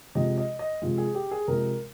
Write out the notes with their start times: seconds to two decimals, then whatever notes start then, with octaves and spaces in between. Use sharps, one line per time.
0.15 C3 F3 G#3 D#5
0.38 D#5
0.59 D#5
0.82 C3 F3 G#3
0.98 G#4
1.15 G4
1.31 G#4
1.48 C3 F3 G#3 A#4